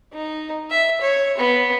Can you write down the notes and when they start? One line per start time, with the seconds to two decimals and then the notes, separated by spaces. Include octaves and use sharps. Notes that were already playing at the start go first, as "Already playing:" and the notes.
0.13 D#4
0.70 E5
1.01 C#5
1.37 B3